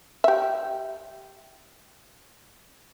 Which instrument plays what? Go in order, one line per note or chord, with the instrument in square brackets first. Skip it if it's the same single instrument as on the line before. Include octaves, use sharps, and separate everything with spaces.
[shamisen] G4 E5